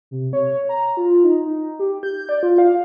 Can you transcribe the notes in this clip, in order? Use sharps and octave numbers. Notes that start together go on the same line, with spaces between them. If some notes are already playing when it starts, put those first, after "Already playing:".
C3
C#5
A#5
F4
D#4
D#4
G4
G6
D5
F4
F5